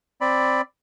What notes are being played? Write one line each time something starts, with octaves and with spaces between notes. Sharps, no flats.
C4 D5 B5